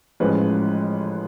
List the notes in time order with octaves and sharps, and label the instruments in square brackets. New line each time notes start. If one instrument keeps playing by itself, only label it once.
[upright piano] A1 G#2 F3 G#3 C#4 B4